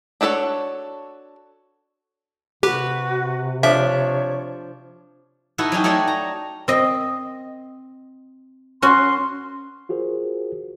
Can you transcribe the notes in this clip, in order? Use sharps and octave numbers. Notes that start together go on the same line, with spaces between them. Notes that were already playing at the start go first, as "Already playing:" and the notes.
D4 F#4 A4 B4 C#5
C3 F#4 G4 B4
F3 D4 C#5 E5
D#4 E4 F#4 A4 B4
F#3 C#4 D#4 G4
A3 D#4 F#4 C#5 D5 G5
A#5
C4 D#5
C#4 F#4 C6
F4 F#4 G#4 A#4 C5